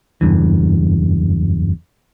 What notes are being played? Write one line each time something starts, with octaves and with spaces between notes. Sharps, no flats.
F#1 E2 G2 E3